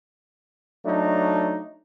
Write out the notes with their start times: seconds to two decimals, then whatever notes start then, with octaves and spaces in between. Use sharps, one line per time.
0.86 F#3 A3 D4 D#4